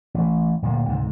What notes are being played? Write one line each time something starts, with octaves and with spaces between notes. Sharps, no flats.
A1
D1 A#2 A#3
C#2 G#2 C3